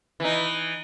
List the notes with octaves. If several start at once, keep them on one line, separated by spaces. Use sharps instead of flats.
E3 D#4